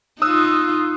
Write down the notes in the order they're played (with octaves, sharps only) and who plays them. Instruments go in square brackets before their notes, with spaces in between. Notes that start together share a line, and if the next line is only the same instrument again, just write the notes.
[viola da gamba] D#4 F4 [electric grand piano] D#6 E6 F#6